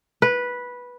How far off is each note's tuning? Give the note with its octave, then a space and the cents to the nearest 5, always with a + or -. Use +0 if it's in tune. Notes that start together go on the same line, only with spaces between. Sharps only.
B4 -10